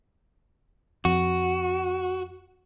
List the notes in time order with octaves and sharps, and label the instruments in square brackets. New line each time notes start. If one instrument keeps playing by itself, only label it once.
[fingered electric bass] F2 [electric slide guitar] F#4